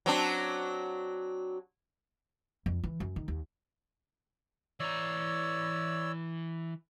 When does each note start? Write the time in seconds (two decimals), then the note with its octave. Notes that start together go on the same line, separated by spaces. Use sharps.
0.06 F#3 C4 D4
2.66 F2
2.84 E3
3.00 F#2
3.16 D#3
3.28 D#2
4.80 E3 C#5 D5 A#5 E6